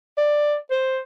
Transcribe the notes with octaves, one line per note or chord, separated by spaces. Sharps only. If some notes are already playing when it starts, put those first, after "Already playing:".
D5
C5